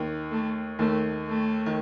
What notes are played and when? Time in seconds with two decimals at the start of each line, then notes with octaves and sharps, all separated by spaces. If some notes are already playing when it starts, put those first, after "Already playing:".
Already playing: D#2 D#3
0.31 A3
0.79 D#2 D#3 A3
1.27 A3
1.66 D#3